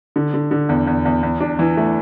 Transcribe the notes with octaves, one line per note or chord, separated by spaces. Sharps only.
D3
D3
D3
E2
E2
E2
E2
D4
E3
A3